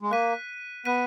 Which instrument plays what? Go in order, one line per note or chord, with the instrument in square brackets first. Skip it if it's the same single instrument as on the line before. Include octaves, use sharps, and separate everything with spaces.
[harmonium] G#3
[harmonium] A#3 [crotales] F#6 B6 D#7
[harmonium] B3 [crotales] F#6 B6 D#7